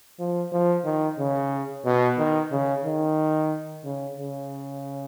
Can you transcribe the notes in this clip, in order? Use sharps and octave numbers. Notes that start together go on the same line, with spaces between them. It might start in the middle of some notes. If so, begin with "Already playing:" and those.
F3
F3
D#3
C#3
B2
D#3
C#3
D#3
C#3
C#3